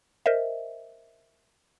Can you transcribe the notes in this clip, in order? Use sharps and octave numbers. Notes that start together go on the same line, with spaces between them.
A#4 C5 D#5 E5